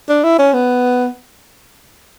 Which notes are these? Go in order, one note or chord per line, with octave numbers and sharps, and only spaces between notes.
D4
E4
C#4
B3